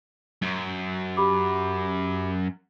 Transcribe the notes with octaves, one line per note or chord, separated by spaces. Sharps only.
F#2
G4 B5 D6